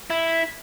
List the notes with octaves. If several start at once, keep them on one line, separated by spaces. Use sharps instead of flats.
E4